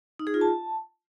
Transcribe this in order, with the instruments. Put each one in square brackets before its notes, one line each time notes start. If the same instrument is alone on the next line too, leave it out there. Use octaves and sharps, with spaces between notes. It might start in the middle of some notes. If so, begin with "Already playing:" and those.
[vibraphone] D#4
G#4
F4
A5